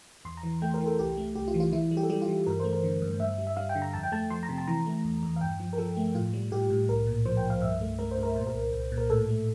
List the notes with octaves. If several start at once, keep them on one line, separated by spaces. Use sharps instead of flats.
E2 C6
A#5
E3
A3 G5
A#4
E3
A4
C2 G4
A3
C2 G4
F4
E3
F4
E3 E4
G3
G4
A4
G3 G4
F4
E3
G2 A#4
A3 C5
A#4
D3
G2
G2 E5
G3
E5
G3 F5
G5
D3
A#5
F2 A5
G5
A3 A5
F3 C6
A#5
C3
A5
E3 A#5
A3
E2
E2
F5
G2 G5
F3
A#4
F3 A4
A3
A2 F4
G3
A2 G4
A2
C2 A#4
A#2
F3 C5
G5
C2
F5
G2 E5
A3
A3 A#4
C5
G2
A#4
A#2 C5
A#4
C2
C2
A#2
A#4
A2 A4
A3